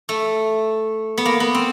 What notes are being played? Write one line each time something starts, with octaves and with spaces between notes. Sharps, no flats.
A3
B3
A#3
B3
C4